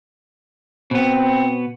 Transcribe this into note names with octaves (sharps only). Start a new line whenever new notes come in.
B2 B3 C4